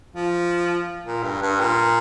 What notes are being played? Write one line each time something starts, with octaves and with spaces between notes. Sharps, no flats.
F3
A#2
G2
G2
A#2